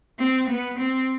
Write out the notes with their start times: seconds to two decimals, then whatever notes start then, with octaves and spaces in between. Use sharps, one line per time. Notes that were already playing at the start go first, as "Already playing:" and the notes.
0.19 C4
0.50 B3
0.79 C4